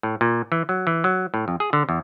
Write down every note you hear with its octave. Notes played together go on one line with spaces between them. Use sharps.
A2
A#2
E3
F#3
E3
F#3
A2
F2
G#4
D3
E2